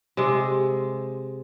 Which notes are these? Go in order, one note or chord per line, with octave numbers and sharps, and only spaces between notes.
C3 G#3